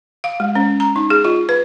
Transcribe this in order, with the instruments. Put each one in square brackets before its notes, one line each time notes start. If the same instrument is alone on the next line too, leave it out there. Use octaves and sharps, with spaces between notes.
[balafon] F5
G#3
C#4
A#5
D#4
G#4
F4
B4